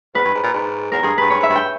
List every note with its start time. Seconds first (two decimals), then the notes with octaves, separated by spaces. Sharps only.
0.15 E2 B4
0.24 G2
0.34 G#2
0.43 A#2
0.53 G#2
0.92 E2 A#4
1.02 G2 G#4
1.18 G2 B4
1.30 G2 C#5
1.40 G#2 E5
1.49 G2
1.56 G5